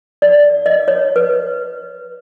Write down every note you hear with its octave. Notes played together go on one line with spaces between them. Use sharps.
D5
D#5
C#5
B4